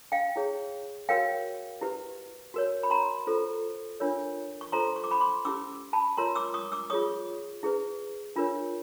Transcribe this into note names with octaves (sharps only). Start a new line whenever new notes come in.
F5 G5
E4 G#4 C#5
F#4 A#4 C#5 F5 G5
E4 G4 B4
F#4 A#4 C#5
B5
A#5 C6
F4 A4 C5
D4 F4 A#4 C#5
C#6
F4 A4 C5 A#5 C6
C#6
D6
B5 C#6
C6 D6
C#4 E4 G4 D6 E6
A5 B5
F4 A#4 C#5 A#5 C6
D6 E6
C#6 D#6
D6 E6
F4 G#4 C#5 C#6 D#6
E4 G#4 B4
D4 F4 A#4 C#5